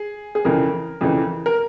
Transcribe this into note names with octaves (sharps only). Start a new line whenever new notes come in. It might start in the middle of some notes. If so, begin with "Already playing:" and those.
Already playing: G#4
G#4
F2 C#3 E3 A#4
F2 C#3 E3
A#4